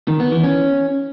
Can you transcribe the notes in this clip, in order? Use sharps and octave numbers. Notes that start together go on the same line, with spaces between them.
D#3
B3
E3
C#4